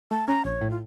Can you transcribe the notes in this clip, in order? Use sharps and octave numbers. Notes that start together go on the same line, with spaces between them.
A3 A5
C#4 A#5
A#1 C#5
A2
F4